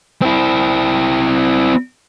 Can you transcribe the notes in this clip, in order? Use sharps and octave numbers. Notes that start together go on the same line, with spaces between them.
C4 E4